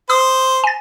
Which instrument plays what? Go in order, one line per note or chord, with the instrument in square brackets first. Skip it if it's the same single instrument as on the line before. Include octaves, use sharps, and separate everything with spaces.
[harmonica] C5 [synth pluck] D#6
[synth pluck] G#5 A6